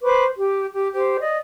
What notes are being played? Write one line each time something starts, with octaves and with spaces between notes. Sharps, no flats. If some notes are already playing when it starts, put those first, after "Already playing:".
B4 C5 C#6 D6
G4
G4
G4 C5
D5 D#5